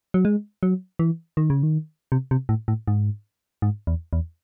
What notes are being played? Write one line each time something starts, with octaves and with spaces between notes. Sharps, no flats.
F#3
G#3
F#3
E3
D#3
C#3
D#3
C3
C3
A2
A2
G#2
G#2
E2
E2